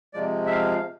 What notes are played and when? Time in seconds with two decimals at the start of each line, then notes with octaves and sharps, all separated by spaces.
0.13 C3 F3 G#3 D5
0.46 E5
0.52 F5